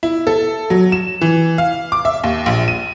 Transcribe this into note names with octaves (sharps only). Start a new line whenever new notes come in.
E4
A4
F#3
E7
E3
F5
D6
E5
D#2
A#1
D#7